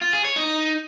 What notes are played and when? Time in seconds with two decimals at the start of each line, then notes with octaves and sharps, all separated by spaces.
0.01 F4
0.13 G#4
0.25 C#5
0.36 D#4